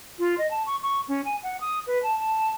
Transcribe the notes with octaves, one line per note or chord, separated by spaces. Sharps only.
F4
D#5
A5
C#6
C#6
C#4
G#5
F#5
D#6
B4
A5
A5